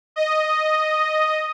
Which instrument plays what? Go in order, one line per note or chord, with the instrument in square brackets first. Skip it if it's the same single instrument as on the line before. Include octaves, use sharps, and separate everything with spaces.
[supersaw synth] D#5